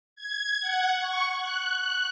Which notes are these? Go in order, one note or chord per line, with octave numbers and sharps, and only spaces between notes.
G#6
F#5
C#6
F#6